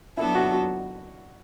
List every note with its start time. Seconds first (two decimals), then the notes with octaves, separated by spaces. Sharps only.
0.17 F#3 B3 D4 E4 A4
0.35 F#4
0.52 F#4